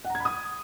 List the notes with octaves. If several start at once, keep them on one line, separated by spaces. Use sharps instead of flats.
F#5
A#5
G#6
B5
D#6